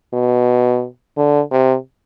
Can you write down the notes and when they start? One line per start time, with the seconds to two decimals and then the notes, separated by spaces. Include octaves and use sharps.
0.13 B2
1.17 D3
1.52 C3